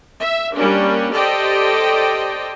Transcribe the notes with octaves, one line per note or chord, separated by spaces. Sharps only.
E5
G3 A#3 C#4 D4
G4 A4 C5 D5 D#5 G5